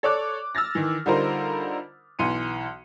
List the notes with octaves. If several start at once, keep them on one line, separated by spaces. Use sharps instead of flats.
A4 C#5 D5 D6 F#6
E6 F6 A6 A#6
D#3 E3
D3 G3 D#4 F4 A#4 C5
B1 E3 C6 C#7 D#7